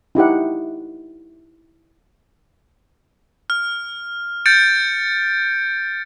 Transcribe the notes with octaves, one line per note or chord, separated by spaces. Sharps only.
D#4 E4 G4 F#5
F6
G6 A6 C#7 D7